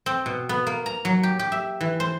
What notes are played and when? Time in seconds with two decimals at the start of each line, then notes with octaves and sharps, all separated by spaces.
0.06 C4
0.26 B2
0.49 B3
0.67 A#3
0.86 A#5
1.05 F#3
1.23 G4
1.39 G4
1.52 E5
1.81 E3
2.00 C5